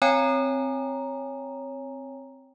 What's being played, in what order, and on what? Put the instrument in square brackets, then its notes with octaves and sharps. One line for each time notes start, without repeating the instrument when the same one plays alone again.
[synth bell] C4 C#5 G5 G#5 A#5